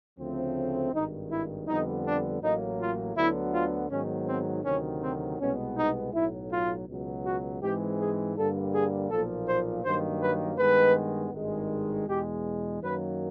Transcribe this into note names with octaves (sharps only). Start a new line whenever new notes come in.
D2 C#3 F3 A3 C4
G#1 G2 D#3 D#4
E4
F2 D3 G3 B3 D#4
D4
A1 A2 F#3 A#3 D#4
F4
D2 D3 F#3 B3 E4
F4
G#2 D#3 F#3 B3 C#4
C4
D2 C3 D#3 F#3 C#4
C4
C2 B2 G#3 B3 C#4
D#4
B1 A2 F#3 E4
F4
C#2 B2 F#3
F#4
G#2 E3 G#3 C4 G4
G#4
G2 D3 G3 A#3 A4
G#4
B1 A#2 F3 A#3 A4
C5
G2 D#3 F#3 A#3 C5
B4
G2 D#3 G#3 B3 B4
G#1 G2 D#3 G#3
E2 B2 G#3 G4
F#2 D#3 F#3 A#3 B4